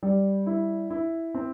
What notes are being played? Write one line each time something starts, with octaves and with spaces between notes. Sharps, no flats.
G3
E4
E4
C4